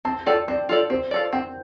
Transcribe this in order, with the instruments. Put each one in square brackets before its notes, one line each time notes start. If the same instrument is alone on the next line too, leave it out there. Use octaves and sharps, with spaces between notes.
[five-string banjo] C4 [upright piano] A5
[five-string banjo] F4 A4 D5 [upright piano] G5
[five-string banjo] C4 [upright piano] D5
[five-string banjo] F4 A4 D5
[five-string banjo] C4 [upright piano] C5
[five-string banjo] F4 A4 D5
[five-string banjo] C4 [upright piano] G5